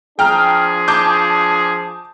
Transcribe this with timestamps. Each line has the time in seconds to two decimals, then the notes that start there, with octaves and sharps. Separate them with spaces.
0.19 F3 D4 G#4 G5 A#5 F6
0.88 A5 D6 G6